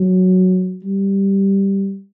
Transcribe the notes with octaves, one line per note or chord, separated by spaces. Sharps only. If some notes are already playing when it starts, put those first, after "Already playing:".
Already playing: F#3
G3